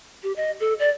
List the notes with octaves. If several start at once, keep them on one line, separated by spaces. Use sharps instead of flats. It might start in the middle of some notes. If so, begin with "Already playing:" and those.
G4
D#5
A4
D5